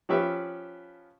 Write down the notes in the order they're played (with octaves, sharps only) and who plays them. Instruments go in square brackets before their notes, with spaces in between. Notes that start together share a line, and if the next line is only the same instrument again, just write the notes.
[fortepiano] F3 C#4 G4 B4 E5